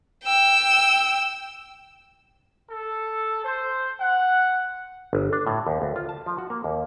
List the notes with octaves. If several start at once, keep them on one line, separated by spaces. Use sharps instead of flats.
G5 E6
A4
C5
F#5
G1
D4
A2
D#2
D2
F4
A5
F3
F#4
A#3
D#2